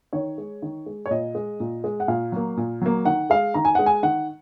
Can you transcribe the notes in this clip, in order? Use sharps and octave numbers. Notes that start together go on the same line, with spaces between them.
D#3 C#5
G#3
D#3
G#3
C#5
A#2 D#5
G#3
A#2
G#3
F#5
A#2 F5
F#3 A#3
A#2
F#3 A#3
D#3 F#5
G#3 F5
D#3 A#5
G#5
G#3 F#5
G#5
D#3 F#5